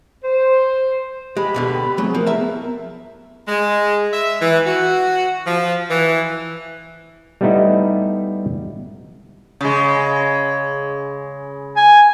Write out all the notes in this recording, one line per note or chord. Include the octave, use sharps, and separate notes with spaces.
C5
G#3 G4 B5
D2 B2 D3
F#3 A3 C4 G#4
F3 B3 E4 A#4
E5 A5
G#3
E5
E3
F#4
F3
E3
G3 A3 B3 D#4 E4
C#3 G#3
G#5